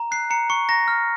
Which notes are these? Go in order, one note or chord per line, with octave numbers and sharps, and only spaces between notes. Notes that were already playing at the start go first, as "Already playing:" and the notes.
Already playing: A#5
F#6 C7
A#5 C#7
C#6 C#7
A#5 A#6
F6